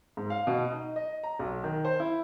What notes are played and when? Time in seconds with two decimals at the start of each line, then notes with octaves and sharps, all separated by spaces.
0.17 G#2
0.30 F5
0.47 B2
0.72 D#4
0.96 D#5
1.24 A#5
1.39 B1
1.64 D#3
1.85 C5
2.00 E4